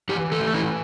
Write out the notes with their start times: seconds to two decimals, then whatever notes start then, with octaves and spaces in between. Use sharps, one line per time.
0.09 E3 G4
0.32 A3 A4
0.54 E3 E4